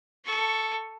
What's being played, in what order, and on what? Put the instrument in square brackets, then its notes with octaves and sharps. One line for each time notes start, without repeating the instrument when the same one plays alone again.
[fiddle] A4 C#6